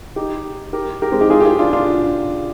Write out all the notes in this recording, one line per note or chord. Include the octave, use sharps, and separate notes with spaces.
D#4 G4
G4 A#4
G4 A#4
G#3 C4
D#4 G4
F4 G#4
G4
F4 G#4
D4 F4
D4 F4